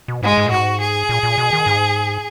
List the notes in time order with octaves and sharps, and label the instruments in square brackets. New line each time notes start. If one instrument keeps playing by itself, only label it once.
[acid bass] B2
[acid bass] G#2 [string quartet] G#3
[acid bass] G#2
A#2
[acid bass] G#2 [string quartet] F#4
[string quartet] G#4
[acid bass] A#2
A#2
B2
D#3
G#2